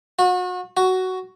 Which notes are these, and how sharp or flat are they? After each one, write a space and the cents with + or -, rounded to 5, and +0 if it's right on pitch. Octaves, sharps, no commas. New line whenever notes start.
F#4 -35
F#4 +10